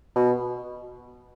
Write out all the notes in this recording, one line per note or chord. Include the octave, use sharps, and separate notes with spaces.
B2